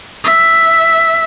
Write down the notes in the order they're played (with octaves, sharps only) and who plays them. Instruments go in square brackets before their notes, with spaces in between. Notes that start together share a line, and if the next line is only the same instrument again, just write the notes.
[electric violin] E5